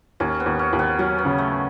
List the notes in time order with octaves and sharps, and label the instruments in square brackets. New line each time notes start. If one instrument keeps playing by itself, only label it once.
[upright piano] D#2 [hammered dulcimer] C#4
[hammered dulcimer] B3
[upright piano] D#2
[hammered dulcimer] C#4
[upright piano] D#2
[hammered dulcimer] B3
[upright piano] F#3 [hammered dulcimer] C#4
[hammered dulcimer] B3
[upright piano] C#3
[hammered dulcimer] A3